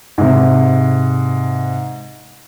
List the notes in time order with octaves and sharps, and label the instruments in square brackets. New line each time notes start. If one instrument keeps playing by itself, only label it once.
[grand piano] G#2 C3